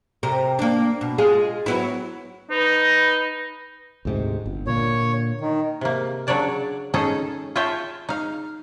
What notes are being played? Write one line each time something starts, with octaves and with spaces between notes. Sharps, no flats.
C3 A#4
A#3 D4
B2
G#3 F4 G#4
F#3 B3 E4
D#4 B4
D2 G#2 C3
G1
A#2 D3 A#3 C#5
D#3
C3 A#3
C#3 F#3 D4 C#5 D5 A5
C#4 D#4 G#4 A4 D#5
F4 G#4 C#5 E5 G5 A5
D#4 F5